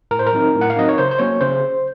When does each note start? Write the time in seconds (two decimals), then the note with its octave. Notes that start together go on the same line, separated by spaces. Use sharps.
0.11 A2 A#4
0.19 C5
0.27 A#4
0.33 F#3 C4 D#4
0.54 A2
0.61 F#5
0.70 F5
0.76 F#3 C4 D#4 D#5
0.89 C#5
0.98 C#3 C5
1.11 C5
1.19 F#3 A#3 C#4 C#5
1.41 C#3 C5